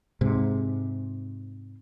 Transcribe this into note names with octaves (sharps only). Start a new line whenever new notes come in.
G#2 C3